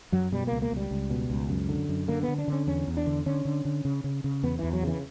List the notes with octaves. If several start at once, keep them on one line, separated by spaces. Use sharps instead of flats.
F#2 F#3
B2 G3
C#2 A#3
A#3
C#2 G3
C#2
B2
C#2
F#2
D3
F#2
D3 A#3
B3
D3
D4
D3 C#4
E2 C#4
E2
D4
D3
D3 C#4
D3
D3
C#3
C#3
C#3
E2 B3
E2 E3
F#3
C#3 E3